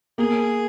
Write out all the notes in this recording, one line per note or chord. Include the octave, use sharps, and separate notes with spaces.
A#3 G#4